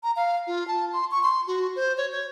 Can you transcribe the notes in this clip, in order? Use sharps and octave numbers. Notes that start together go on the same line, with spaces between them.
A#5
F5
F4
A5
C6
C#6
C6
F#4
C5
C#5
C#5